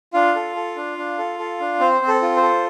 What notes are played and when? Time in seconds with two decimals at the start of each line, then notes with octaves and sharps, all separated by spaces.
0.14 D4 F4 F5
0.36 A4
0.56 A4
0.76 D4
0.98 D4
1.18 A4
1.39 A4
1.60 D4
1.80 C4 C5
2.01 C4
2.08 A4
2.22 F4
2.36 C5
2.42 A4